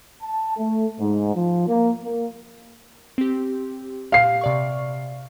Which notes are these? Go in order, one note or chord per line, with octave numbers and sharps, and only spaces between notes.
A5
A3
G#2
F3
A#3
A#3
C4 G4
A#2 G4 F5 C7
C3 D5 C#6